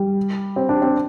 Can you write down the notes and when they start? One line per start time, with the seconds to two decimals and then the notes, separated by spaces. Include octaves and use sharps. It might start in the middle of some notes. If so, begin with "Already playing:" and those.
Already playing: G3
0.56 C4
0.69 D4
0.82 C4